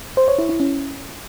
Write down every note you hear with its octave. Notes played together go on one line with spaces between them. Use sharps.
C5
C#5
E4
E4
C#4